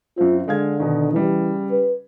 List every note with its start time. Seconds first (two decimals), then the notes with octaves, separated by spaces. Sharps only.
0.18 F#2 C4 F4
0.48 D3 G#3 F5 G#6
0.80 B2 D#3
1.12 C#3 E3 G3
1.71 B4